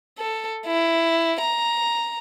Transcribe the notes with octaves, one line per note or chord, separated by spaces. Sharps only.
A4
E4
A#5